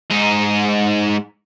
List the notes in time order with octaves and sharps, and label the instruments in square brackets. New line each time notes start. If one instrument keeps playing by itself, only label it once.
[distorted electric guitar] G#2 D#4